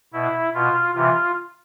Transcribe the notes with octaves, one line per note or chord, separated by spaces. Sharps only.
B2 E4
B2 F4
C3 E3 F4